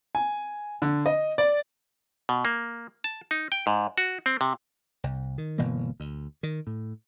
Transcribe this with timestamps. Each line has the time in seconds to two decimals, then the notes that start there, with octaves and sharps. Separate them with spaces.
0.15 G#5
0.82 D3
1.06 D#5
1.38 D5
2.29 B2
2.45 A#3
3.04 A5
3.31 D#4
3.52 G5
3.67 G#2
3.98 F#4
4.26 C4
4.41 C3
5.04 C2
5.38 D#3
5.58 G1 B2 E3 A#3
6.00 D2
6.43 D#3
6.67 A2